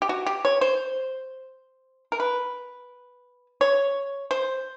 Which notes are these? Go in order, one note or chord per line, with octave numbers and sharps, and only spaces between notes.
G4
F#4
G4
C#5
C5
A#4
B4
C#5
C5